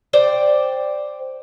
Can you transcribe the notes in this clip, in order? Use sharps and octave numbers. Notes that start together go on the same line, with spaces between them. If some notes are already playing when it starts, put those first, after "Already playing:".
C5 D5 G5